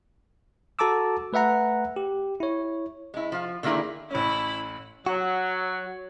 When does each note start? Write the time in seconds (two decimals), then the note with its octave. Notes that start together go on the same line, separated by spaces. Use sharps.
0.79 F#4 A4 A5 A#5 D6 E6
1.33 A3 B4 E5 F#5 A#5
1.96 G4
2.40 E4 C#5
3.14 G#3 E4
3.32 F3 F5
3.63 D3 D#3 A#3 E4 G#4 D5
4.11 A1 C#4 E4 B5
5.06 F#3 F#4 C#5